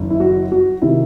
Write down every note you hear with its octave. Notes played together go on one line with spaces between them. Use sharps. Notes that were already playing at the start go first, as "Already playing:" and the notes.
Already playing: F#1 F#2 D#3
E4
F#4
F#4
C3 D#3 E4